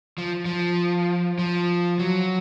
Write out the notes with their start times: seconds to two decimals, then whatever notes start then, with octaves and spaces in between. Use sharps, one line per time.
0.18 F3
0.45 F3
1.39 F3
1.99 F#3